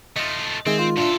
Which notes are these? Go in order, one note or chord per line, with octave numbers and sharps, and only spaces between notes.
A3 F4 D#5
D#3 G#3 C4 D#4 G#4 E5
F4
A#2 D4 F4 A4 E5